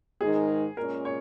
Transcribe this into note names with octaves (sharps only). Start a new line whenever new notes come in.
G#2 D#3 G#3 D#4 G#4 A#4
A#2 G#3 C#4 A#4
C#5